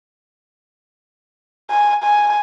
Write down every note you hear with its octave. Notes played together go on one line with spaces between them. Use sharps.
G#5
G#5